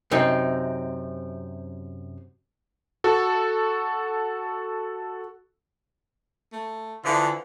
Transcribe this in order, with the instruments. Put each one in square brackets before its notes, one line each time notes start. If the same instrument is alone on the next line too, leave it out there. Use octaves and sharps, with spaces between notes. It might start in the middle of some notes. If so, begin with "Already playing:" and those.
[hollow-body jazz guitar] F#2 C3 C4 D#4
[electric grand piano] F#4 A4
[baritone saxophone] A3
[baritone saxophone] D3 [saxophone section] E3 F3